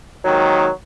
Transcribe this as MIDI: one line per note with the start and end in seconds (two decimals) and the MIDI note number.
0.25 0.68 39
0.25 0.68 44
0.25 0.68 51
0.25 0.70 54